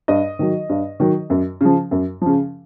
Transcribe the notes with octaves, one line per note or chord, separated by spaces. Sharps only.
G2 D#5
D#3 F#3
G2
D#3 F#3
F#2
C#3 F3
F#2
C#3 F3